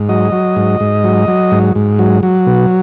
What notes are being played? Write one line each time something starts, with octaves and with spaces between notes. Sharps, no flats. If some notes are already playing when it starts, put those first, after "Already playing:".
Already playing: G#2
F#3 D#5
F#3
G#2
G#2
F#3
F#3
G#2
G#2
F#3
F#3
B2